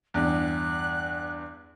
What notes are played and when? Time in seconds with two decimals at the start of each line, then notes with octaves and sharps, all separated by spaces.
0.14 E2 G2 F#6